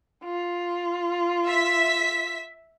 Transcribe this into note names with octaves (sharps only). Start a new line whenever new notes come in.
F4
E5 B6